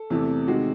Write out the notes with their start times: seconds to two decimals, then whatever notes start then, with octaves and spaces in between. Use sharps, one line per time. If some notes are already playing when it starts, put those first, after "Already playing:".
Already playing: A4
0.10 E2 C3 E3 A3
0.47 C3 D#3 G#3 F#4